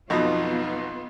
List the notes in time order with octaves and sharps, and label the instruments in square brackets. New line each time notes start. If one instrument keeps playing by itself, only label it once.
[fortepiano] B1 F2 B2 [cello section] B3 F4 [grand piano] D#4